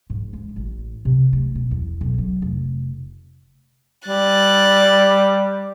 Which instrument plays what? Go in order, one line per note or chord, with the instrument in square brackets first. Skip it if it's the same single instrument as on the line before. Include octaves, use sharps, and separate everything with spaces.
[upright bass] G#2
G#3
A1
C3
A3
B2
E2
B1
F#3
F1
[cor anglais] G3 [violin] F#6 A6